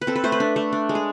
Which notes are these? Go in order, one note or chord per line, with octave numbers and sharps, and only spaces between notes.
B4
C4 A4
B4
A3 C5
B4
D4
A3
D4
G#3
G#4